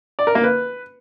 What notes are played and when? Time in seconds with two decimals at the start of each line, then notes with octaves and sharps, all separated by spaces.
0.19 D5
0.27 A#4
0.35 A#3
0.44 B4